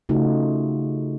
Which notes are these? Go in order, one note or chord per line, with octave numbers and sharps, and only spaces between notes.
C#3 A3 D#4 F4 F#4